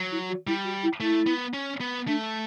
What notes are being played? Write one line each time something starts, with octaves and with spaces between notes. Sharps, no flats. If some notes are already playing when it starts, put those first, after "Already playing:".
Already playing: F#3
E4
F#4
G3 E4
F#4
E4
A3 E4
B3
C#4
B3
A3 D4